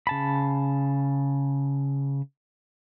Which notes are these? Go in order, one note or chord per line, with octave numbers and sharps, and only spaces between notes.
C#3 A5 B5